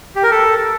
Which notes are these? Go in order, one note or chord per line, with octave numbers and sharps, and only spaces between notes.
G4
A#4
A4